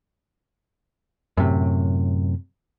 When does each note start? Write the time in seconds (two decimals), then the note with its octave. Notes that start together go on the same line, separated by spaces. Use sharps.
1.37 F#2 A2 C3